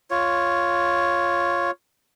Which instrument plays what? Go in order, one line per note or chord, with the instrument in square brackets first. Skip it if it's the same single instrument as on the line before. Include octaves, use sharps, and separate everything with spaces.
[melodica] F4 C#5